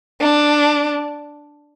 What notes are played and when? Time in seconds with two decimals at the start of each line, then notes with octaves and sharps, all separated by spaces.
0.21 D4